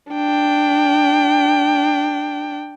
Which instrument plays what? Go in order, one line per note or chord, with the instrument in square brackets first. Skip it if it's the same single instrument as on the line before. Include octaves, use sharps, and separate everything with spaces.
[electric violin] D4 G5